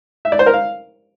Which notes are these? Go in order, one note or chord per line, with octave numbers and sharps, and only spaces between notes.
E5
D5
C5
A#4
F5